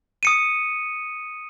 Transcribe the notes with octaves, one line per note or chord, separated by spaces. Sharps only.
D#6 C#7 D#7